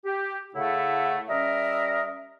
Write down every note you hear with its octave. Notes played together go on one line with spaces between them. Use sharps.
G4
A2 C#3 A3 E4 F#5
G3 C#4 A#4 D#5 E5